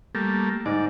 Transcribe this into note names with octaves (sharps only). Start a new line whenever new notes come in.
G3 A3 A#3
G#2 D5